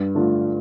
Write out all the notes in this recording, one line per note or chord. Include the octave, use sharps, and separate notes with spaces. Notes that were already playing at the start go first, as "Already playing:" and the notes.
Already playing: G2
D3 A3 D4 F4